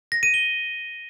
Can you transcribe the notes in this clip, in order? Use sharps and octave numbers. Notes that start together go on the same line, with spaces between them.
A#6
D#7
G7